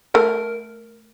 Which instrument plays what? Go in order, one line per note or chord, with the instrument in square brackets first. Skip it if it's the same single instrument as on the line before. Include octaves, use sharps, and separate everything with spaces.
[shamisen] A3 [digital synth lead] A#4